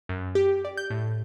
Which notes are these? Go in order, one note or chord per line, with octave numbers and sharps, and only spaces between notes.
F#2
G4
D5
G6
A2